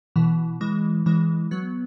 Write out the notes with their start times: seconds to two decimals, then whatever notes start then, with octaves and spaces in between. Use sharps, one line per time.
0.16 B2 E3
0.61 E3 G#3
1.06 E3 G#3
1.51 F#3 B3